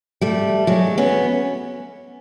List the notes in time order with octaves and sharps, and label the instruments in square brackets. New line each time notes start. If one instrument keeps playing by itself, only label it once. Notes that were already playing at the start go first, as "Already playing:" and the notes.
[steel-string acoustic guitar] G3 A3
F#3 G#3
B3 C#4